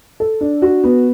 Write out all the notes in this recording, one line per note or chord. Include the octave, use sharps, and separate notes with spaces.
A4
D4
F#4
B3